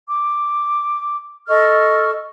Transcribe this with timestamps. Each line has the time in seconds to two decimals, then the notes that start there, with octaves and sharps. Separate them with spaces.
0.08 D6
1.47 A4 D#5 C#6 F6